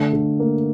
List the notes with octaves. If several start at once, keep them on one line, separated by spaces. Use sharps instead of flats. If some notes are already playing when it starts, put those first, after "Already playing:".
Already playing: D3 A3
D3
A#3